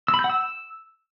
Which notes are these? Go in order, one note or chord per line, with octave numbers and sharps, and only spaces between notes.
E6
B5
G6
F#5
E6